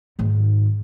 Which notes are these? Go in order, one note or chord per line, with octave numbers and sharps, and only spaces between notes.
G#2 D#3